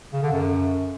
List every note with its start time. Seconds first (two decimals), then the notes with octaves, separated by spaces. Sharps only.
0.13 C#3
0.23 D3
0.32 F#2